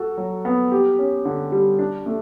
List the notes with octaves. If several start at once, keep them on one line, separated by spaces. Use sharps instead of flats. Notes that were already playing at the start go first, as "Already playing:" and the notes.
Already playing: F#4 A4
F#3
B3
G4
C#4
D3
G3
D4
A3